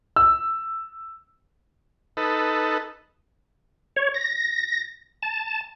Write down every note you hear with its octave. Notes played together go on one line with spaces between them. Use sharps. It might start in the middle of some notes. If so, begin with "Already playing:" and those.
E6
D#4 A4 B4
C#5
A#6
A5